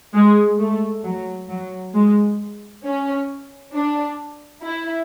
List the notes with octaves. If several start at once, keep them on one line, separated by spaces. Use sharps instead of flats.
G#3
A3
F#3
F#3
G#3
C#4
D4
E4